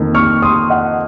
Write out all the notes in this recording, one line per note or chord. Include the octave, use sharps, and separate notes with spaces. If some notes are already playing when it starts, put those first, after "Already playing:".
Already playing: F2 D#3 A#3
C#6 F6
C6 D#6
D#5 F#5